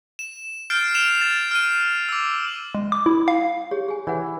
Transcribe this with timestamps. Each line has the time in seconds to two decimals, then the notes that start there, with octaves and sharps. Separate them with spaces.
0.19 E7
0.70 F6 G6 A6 C7 D7
0.95 F6 C7 D7 E7 F7
1.21 A6
1.51 F6 D#7
2.09 D6 E6
2.75 G#3
2.92 D6
3.06 E4
3.28 F5
3.71 G4 G#4 C#5
3.88 G#4 G#5
4.07 E3 C#5 F#5